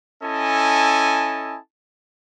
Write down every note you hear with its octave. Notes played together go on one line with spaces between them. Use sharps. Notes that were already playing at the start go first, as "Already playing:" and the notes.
C#4 E4 A4 D#5 G#5 A5